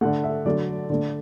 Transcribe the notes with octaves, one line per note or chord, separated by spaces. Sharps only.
D3 A3 F#5
E5
D3 F#3 A3 D5
D3 A3